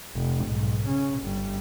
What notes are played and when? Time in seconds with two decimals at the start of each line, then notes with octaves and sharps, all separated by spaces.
0.15 F1
0.46 B1 G#2
0.87 C#3 C#4
1.21 G1 G3